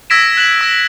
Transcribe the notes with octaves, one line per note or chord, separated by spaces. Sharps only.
E6 G#6 A#6 B6 D7 E7
F#6 E7 F#7
E6 A#6